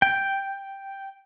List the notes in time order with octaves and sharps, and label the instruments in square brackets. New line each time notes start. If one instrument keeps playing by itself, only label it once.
[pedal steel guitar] G5